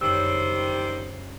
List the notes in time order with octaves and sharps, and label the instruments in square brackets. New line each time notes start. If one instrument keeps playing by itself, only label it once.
[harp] G1 C#2 F#2 [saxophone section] D#3 G3 C5 [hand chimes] E6